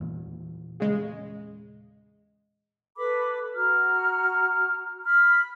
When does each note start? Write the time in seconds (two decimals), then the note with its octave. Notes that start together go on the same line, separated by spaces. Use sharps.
0.01 E2 A#2 E3
0.80 C#3 G#3
2.98 A4 B4 B5 D6
3.54 F#4 A#5 F6
5.04 B5 F6